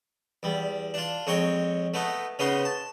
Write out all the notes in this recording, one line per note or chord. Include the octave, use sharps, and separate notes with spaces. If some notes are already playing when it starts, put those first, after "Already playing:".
E2 G3
D4 F4
F2 G#3 C#5 G5 C#6
A3 B3 D#4
C#3 B3 C#4 D#4 C6
A5